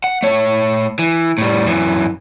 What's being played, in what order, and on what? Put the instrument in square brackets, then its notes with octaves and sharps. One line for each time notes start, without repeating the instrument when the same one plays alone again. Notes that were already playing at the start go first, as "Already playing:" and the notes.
[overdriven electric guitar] F#5
A3 C#5
E3
A2 G3
F#2 E3